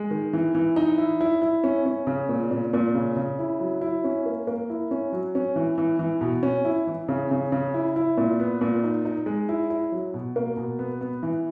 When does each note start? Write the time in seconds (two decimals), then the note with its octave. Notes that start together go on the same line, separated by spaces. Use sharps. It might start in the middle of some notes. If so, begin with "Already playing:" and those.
Already playing: G#3
0.11 D#3
0.33 E3
0.55 E3
0.76 D#4
0.98 E4
1.21 E4
1.42 E4
1.64 C#4
1.86 C#4
2.07 C#3
2.29 A#2
2.51 A#2
2.73 A#2
2.94 C#3
3.16 C#3
3.39 E4
3.60 F#3
3.81 E4
4.04 C#4
4.26 A#3
4.47 A#3
4.70 E4
4.91 C#4
5.12 F#3
5.35 C#4
5.56 E3
5.78 E3
5.99 E3
6.21 B2
6.43 C#4
6.65 E4
6.87 E3
7.09 C#3
7.31 C#3
7.52 C#3
7.74 E4
7.96 E4
8.17 A#2
8.40 B3
8.61 A#2
8.84 D#4
9.05 D#4
9.26 G#3
9.49 E4
9.70 E4
9.92 F#3
10.14 B2
10.36 A#3
10.57 B2
10.79 B3
11.01 B3
11.23 E3